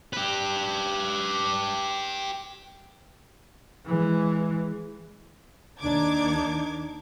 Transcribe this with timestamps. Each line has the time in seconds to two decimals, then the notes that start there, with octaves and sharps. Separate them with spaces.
0.13 G4 B4
3.86 E3 G#3
5.81 D#2 D4 D#4 D6 G#6